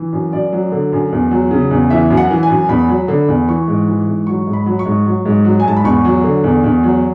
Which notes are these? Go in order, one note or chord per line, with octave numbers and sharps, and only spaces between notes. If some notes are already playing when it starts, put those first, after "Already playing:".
Already playing: E3
F#2
F#2 D5
F#3
D3
F#2
E2
F#3
C#3
E2
E3 E5
F#2
F#5
E3
G#5
F#2
E2 B5
F#3
D3
E2
E3 C#6
G#2
E3
G#2
F#3 C#6
G#2
B5
F#3
C#6
G#2
F#3
G#2
F#3
G#5
G#2 A5
B5
E2 C#6
F#3
D3
E2
E2
F#3